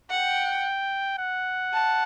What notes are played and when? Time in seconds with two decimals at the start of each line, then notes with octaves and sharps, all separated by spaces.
0.10 F#5 G5
1.19 F#5
1.73 A5